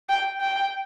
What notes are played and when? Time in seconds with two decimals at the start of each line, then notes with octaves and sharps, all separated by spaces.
0.09 G5
0.41 G5